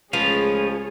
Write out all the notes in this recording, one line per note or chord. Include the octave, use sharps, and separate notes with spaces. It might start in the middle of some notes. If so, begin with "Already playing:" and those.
C#2 F3 A3 G#4 B4 C#5 F5